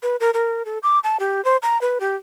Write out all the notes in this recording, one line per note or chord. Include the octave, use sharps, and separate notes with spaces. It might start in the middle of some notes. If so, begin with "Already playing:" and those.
B4
A#4
A#4
A4
D6
A5
G4
C5
A#5
B4
G4